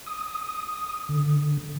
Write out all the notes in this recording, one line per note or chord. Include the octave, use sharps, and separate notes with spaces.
D#6
D3